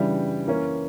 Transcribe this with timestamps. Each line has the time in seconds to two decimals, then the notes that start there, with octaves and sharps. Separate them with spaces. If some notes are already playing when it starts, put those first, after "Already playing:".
Already playing: C#3 E3 G3 D4
0.47 E3 A#3 C#4